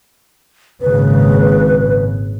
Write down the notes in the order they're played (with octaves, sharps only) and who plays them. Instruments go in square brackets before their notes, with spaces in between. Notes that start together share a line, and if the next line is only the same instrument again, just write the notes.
[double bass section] G#1 A#2 C#3 [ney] B4